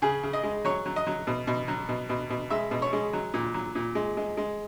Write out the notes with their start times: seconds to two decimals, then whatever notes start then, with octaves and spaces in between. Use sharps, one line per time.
0.02 C#3 G#4
0.23 C#3
0.33 D#5
0.43 G#3
0.64 F#3 C#5
0.86 F#3
0.96 D#5
1.07 F#3
1.27 B2
1.47 B2
1.68 F#3
1.89 B2
2.09 B2
2.30 B2
2.50 G#3 E5
2.71 B2
2.82 C#5
2.93 G#3
3.13 F#3
3.34 A#2
3.54 F#3
3.75 A#2
3.95 G#3
4.17 G#3
4.37 G#3